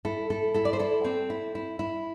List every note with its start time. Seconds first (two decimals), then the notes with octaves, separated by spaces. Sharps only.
0.05 E4 A4
0.30 E4 A4
0.54 E4 A4
0.65 D5
0.73 C5
0.79 E4 A4
1.04 C4
1.30 E4
1.55 E4
1.79 E4